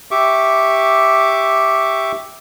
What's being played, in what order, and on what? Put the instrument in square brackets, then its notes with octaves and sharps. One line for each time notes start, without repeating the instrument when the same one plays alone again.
[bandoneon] G4 E5 C#6 D6